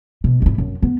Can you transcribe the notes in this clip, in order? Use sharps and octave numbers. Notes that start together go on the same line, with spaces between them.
B2
G#1 E4
F#2
B3